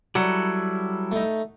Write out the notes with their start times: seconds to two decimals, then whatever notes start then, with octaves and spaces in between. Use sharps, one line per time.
0.15 F#3 G3 E4 A4
1.11 A3 D#4